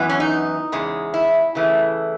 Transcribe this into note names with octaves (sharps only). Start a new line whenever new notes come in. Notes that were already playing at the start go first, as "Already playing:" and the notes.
Already playing: F#2 E3 B3
C#4
D#4
E2 C#3 G#3
E4
C#3 E3 A3